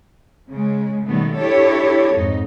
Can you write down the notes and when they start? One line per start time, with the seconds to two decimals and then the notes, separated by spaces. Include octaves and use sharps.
0.51 C#3 G#3
1.07 B2 D#3 G3 A3 B3
1.37 D4 E4 G4 A4 C#5
2.15 F2 G#2 D#4